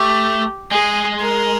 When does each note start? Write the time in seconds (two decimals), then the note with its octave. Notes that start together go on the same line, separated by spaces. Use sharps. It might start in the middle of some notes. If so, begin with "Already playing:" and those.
Already playing: A3 G4
0.71 G#3 G#4
1.21 A#4